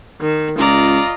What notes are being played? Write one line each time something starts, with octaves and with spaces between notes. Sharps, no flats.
D#3
C#2 F4 D5 D#5 A#5